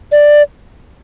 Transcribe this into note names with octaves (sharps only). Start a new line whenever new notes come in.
D5